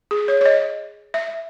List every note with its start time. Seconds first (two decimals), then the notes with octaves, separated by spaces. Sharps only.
0.11 G#4
0.28 C#5
0.41 C#5
0.46 D#5
1.14 E5